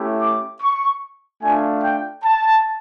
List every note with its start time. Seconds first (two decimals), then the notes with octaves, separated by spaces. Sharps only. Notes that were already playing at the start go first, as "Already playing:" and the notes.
Already playing: A3 C#4 E4 G4
0.21 D6
0.61 C#6
1.43 A3 D4 F4 G#5
1.82 G5
2.23 A5